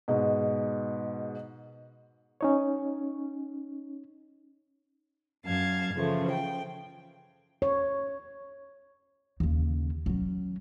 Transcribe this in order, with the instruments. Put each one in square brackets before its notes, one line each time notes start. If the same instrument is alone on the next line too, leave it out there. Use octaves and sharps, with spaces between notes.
[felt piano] G#2 B2
[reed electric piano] C#4 D#4 C#5
[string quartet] F#2 F5 A5 G#6
C#3 E3 F3 A3
G5
[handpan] C#5
[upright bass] D#2 C#3
F#3 C#4